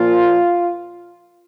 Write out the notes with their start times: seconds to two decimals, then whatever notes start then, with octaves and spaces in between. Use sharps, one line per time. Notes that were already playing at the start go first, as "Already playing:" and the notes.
Already playing: A#2 F3 A#3 F4